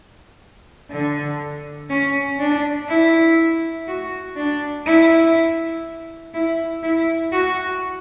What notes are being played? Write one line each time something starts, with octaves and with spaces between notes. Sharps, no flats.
D3
C#4
D4
E4
F#4
D4
E4
E4
E4
F#4